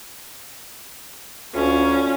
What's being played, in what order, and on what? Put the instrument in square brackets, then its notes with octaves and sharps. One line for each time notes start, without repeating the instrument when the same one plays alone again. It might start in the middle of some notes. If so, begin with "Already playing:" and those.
[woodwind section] D2 [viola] C#4 F4